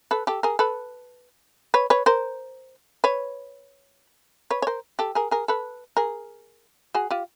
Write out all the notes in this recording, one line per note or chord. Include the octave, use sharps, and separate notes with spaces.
A4 B4
G4 A4
G#4 A#4
A4 B4
B4 C#5
B4 C#5
A#4 C5
B4 C#5
B4 C#5
C#5
A#4 C5
G4 A4
G#4 A#4
G#4 A#4
A4 B4
G#4 A#4
F#4 G#4
F4 G4